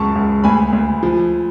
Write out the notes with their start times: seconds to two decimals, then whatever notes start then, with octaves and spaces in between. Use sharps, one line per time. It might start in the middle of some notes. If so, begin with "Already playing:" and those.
Already playing: C#2 F#2 A5 C#6
0.15 C#2
0.44 D2 G#5 B5
0.73 D2
1.03 F3